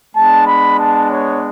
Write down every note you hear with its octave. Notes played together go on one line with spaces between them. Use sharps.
G#3 B3 D4 A5
B5
A5
C#5